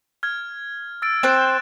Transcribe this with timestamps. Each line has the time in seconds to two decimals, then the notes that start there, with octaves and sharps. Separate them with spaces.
0.23 F6 G#6
1.02 E6 A6 D7
1.23 C4 C5 F#6 A6 E7